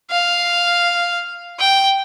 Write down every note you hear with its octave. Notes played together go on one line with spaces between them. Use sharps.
F5
G5